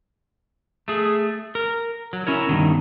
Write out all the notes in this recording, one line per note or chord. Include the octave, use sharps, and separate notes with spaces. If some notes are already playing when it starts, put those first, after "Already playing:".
A3 G#4
A#4
F#3
C#4 E4 A#4 C#5
G2 B2 D#3